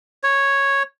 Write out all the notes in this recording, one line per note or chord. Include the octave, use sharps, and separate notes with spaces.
C#5